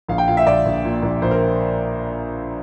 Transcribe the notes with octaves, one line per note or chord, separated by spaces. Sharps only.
A#1 F5
G5
A#2 F5
E5
A#1 D5
A#1
A#2
A#1
A#1 C5
A#4